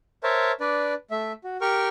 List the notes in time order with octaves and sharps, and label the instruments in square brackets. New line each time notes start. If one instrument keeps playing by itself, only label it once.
[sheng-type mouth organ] A#4 C5 C#5 E5 A5
D4 B4 D5
A3 E5
F#4
G4 A#4 G5 C#6 F6